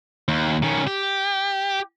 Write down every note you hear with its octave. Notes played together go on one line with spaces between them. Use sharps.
D#2
D#3 C#4
G4